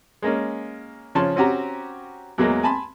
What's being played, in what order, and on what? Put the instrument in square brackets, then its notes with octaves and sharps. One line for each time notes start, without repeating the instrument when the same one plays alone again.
[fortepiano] G#3 A#3 C#4
C#3 F3 C#5 A5 C6
C4 C#4 F#4 G4 A#5
E2 F#3 G#3 A#3
G#5 A5 B5 C6